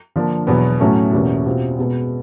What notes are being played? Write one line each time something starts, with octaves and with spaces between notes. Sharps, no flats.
D3 F3 A#3 D4
E2 B2 F#3 B3
A2 F#3 A3 C#4
E2 B2 G3 A#3 C#4
B2 G3 C4 F4
B2 G#3 B3